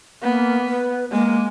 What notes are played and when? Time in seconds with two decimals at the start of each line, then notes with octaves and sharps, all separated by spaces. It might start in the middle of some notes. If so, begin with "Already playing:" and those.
0.23 A#3 B3
0.66 B4
1.12 G#3 A#3